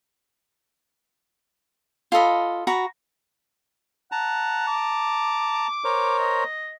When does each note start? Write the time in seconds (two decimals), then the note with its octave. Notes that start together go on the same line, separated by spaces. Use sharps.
2.12 F4 A4 D#5 B5
2.67 F#4 A#5 B5
4.12 F#5 A5 A#5
4.67 D6
5.84 A#4 C5 C#5
6.19 D#5